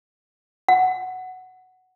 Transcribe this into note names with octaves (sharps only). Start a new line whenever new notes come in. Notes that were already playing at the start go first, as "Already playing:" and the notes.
F#5